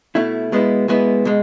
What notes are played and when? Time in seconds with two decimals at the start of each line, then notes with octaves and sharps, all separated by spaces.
0.15 B2 A3 E4
0.52 B2 G#3 B3 E4
0.88 B2 G#3 B3 E4
1.25 B2 G#3